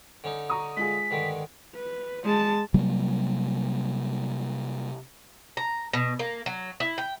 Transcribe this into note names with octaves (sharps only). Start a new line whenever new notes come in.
D3 C#4 D#4
A#5 C#6 D#6
G#3 F4 G#4 B6
G2 D3 D#3
B4
G#3 A5
C3 F#3 G3 A#3
A#5
B2
A#3
F#3
E4
G5